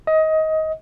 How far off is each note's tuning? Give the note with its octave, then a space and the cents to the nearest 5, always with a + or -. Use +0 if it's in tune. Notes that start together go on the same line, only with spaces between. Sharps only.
D#5 +20